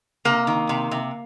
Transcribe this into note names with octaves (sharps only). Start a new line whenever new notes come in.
C3 A#3
D#3
C3
C3